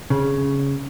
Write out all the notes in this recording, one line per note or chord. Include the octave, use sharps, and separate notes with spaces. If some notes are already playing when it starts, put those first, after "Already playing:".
C#3